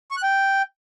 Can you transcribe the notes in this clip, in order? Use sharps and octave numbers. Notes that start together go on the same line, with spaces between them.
C#6
F#6
G5